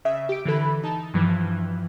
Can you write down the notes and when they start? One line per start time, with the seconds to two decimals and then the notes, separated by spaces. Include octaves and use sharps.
0.05 C#3 E5
0.29 G4 D7
0.45 D3 E3 A4 B5
0.83 D#4 A5
1.14 G2 E3 F3